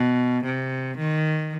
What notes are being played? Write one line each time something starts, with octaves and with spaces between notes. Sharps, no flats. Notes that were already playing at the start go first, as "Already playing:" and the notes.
Already playing: B2
C3
D#3